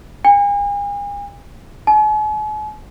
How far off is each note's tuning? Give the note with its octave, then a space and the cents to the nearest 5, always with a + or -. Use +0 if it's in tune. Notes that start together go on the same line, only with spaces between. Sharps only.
G#5 -40
G#5 +45